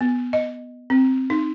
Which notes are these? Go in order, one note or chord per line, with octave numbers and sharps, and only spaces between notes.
B3
D#5
C4
D#4